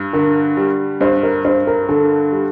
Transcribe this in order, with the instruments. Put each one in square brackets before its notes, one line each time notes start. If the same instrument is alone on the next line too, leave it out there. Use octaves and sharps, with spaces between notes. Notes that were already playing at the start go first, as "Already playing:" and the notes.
Already playing: [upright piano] G2
[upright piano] D3 [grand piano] A#4
[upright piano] G3
[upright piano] G2 [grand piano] C5
[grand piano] A#4
[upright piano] G2 [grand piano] C5
[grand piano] A#4
[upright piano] D3 [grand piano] A4
[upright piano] G3